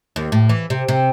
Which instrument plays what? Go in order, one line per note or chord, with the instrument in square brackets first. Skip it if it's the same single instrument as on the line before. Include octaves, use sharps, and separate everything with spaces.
[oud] D#2
A2
E3
C3
C3